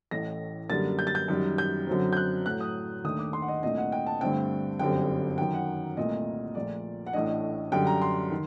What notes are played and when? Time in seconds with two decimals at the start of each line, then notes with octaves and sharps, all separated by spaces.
0.11 A1 A2 A3 A#6
0.69 F#2 D3 G3 A#3 A6
0.99 G6
1.07 A6
1.15 G6
1.28 F#2 D#3 G3
1.58 G6
1.87 F#2 D3 F#3 C4
2.13 G6
2.17 F#6
2.46 A2 F#3 A3 F#6
2.60 D#6
3.04 D#2 D#3 A3 D4 D#6
3.19 D6
3.33 C6
3.42 F#5
3.48 D#5
3.63 C2 A#2 A3 D4 D#5
3.77 F#5
3.92 G5
4.07 A5
4.21 G2 D3 A3 C4 G5
4.79 G1 F#2 D3 G3 C4 G5
5.38 F#2 D#3 F#3 G5
5.54 F#5
5.97 C2 A#2 A3 D#5
6.55 A#1 A#2 A3 D5
7.06 F#5
7.13 A1 A2 A3 D4 D#5
7.72 F#2 D3 G3 G5
7.87 A#5
8.02 C6
8.30 D#3